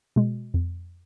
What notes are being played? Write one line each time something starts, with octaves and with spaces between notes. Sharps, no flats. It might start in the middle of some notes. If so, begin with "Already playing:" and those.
B2 G#3
F2